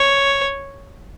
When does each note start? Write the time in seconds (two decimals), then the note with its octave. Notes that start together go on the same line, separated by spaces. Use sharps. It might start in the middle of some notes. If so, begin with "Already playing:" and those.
Already playing: C#5